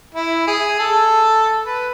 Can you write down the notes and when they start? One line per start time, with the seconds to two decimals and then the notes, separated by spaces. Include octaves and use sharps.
0.15 E4
0.47 G#4
0.79 A4
1.66 B4